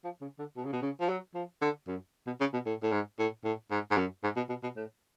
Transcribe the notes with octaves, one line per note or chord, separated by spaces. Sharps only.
F3
C#3
D3
B2
C#3
B2
C#3
F3
F#3
F3
D3
F#2
B2
C#3
B2
A2
A2
G#2
A2
A2
G#2
G#2
F#2
G#2
B2
B2
B2
A2